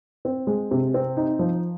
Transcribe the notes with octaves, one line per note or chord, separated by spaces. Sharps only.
C4
G#3
C3
C4
D#4
F3